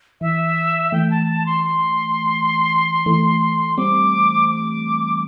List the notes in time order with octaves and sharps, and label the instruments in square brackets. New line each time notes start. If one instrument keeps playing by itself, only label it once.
[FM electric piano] E3 [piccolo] E5
[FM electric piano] E3 A3 [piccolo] G5
[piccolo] A5
A5
C6
C6
[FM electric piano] E3 A3
[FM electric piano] G3 C4 [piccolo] D6
[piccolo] D6